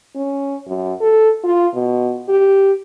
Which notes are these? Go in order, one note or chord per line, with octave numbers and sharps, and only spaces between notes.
C#4
F#2
A4
F4
B2
G4